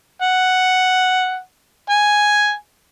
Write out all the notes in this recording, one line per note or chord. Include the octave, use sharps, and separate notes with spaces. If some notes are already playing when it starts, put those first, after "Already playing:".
F#5
G#5